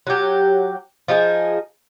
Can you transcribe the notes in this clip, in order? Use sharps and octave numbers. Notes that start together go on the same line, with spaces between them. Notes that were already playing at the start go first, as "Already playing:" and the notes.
F#3 G4
F3 D#4 G4 G#4